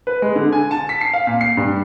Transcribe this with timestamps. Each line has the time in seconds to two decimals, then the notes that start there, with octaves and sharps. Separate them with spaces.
0.07 B4
0.22 G#3
0.35 D3
0.52 G#5
0.71 A5
0.89 B6
1.01 C7
1.14 F5
1.27 A#2
1.41 C7
1.57 G2